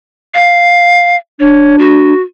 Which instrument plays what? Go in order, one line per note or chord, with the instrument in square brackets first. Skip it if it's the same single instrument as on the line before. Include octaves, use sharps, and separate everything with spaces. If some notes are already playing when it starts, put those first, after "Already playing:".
[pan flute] F5
[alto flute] D4 [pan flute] C#5
[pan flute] F#4